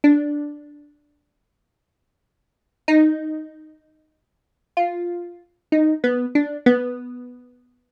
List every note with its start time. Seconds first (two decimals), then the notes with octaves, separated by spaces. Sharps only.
0.04 D4
2.88 D#4
4.77 F4
5.72 D#4
6.04 B3
6.35 D4
6.66 B3